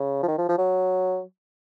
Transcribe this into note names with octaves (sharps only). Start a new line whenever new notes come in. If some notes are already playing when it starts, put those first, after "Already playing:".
Already playing: C#3
F3
D#3
F3
F3
F#3